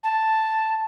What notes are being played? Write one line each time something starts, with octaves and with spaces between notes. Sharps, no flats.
A5